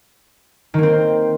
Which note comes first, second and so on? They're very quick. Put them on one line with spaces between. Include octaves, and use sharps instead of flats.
D#3 A#3 C4